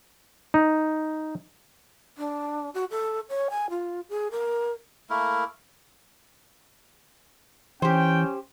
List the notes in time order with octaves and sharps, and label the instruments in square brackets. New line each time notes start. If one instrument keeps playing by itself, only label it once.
[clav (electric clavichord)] D#4
[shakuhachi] D4
F#4
A4
C#5
G#5
F4
G#4
A#4
[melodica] A3 A#3 E4 A#4
[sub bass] E3 [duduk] C#4 [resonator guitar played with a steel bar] G4 C5 [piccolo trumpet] G5